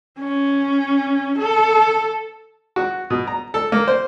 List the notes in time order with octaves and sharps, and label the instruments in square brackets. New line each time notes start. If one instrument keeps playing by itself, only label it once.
[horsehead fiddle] C#4
A4
[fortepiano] F#4
B2
A#5
A4
A#3
C5